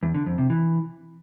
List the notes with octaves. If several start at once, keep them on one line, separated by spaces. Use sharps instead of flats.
E2
D3
F2
C3
E3